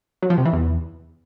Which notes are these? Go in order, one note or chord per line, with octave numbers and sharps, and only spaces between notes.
F#3
F3
C3
E3
E2